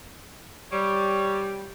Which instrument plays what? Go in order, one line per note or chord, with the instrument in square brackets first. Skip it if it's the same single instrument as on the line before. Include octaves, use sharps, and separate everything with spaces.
[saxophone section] G3 [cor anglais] C#5